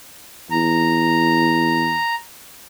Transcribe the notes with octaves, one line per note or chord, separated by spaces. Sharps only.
E2 A#5